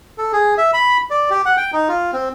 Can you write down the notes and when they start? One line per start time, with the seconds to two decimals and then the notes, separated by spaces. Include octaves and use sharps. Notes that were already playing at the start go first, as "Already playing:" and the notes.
0.18 A4
0.33 G#4
0.58 E5
0.73 B5
1.10 D5
1.30 G4
1.46 F#5
1.57 G5
1.73 D#4
1.89 F4
2.13 C4